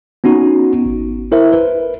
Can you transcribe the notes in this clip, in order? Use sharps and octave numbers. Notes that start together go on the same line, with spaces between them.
B3 C#4 D#4 F#4
G#1
E4 A#4 C5 E5
B4